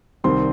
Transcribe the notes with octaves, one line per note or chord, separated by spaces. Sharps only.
C2 C3 D#3 G3 C4 C5 C6